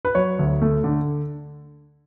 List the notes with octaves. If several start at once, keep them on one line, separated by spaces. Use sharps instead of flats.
B4
F#3 C#5
D2
A3
D3